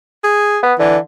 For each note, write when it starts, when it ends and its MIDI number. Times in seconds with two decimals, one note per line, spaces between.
0.24 0.60 68
0.63 0.74 59
0.79 0.98 50
0.79 0.97 52